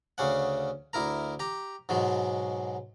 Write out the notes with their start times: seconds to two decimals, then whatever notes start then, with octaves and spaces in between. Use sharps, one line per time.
0.18 D2 C#3 C#4 F#5
0.93 D2 E4 A#4 A#5
1.39 G4 A#5
1.89 G#2 B2 F#3 G#3